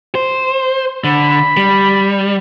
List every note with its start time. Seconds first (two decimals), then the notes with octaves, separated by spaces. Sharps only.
0.15 C5
1.04 D3 B5
1.57 G3